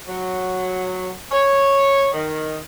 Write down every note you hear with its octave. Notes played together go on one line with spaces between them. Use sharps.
F#3
C#5
D#3